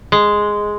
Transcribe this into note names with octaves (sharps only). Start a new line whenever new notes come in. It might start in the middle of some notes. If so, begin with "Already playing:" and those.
G#3